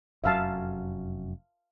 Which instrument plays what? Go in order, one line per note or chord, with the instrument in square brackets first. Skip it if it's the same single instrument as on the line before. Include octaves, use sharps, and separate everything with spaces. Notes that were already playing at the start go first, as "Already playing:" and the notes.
[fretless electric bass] F1 F#2 F#3 [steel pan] E5 F5 A5